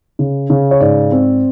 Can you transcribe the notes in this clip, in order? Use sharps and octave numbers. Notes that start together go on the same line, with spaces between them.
C#3
C#3
C#5
G#2 D5
C4